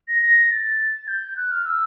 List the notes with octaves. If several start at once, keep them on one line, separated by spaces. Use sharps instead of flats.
A#6
A#6
A6
G6
F#6
F6
E6